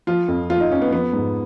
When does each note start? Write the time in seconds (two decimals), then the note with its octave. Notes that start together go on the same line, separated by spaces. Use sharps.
0.07 F3 F4
0.28 F2
0.50 F3 F4
0.60 D#4
0.71 F2 C#4
0.82 B3
0.92 F3 B3
1.13 G#2